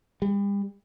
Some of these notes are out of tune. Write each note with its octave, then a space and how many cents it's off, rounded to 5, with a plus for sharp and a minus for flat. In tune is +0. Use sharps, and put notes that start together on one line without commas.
G3 +40